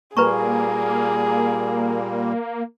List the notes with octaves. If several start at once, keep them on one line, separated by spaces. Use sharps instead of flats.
A#2 G3 A#3 G#4 B4 A#5 C#6